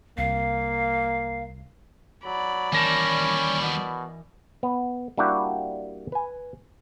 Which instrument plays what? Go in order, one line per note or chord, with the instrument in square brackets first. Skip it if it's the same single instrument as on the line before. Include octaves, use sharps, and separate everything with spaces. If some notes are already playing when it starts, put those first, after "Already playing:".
[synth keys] C2 [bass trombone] A#3 [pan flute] F5
[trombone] F#3 [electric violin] D5 B5
[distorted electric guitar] D#2 G3 [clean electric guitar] E3 A#4 A5 [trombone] C#4
[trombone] B2
[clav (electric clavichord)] B3
G3 A#3 D4 E4 F#4 G4
B4 G#5